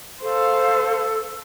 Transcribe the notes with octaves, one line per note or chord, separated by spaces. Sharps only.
A4 C5 F5